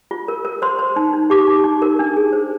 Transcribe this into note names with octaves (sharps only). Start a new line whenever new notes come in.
F4
A#4
A#4
C5 C6
C5
D#4
D#4
G4 D6
D#4
D#4
A#4
D4
G#4
C5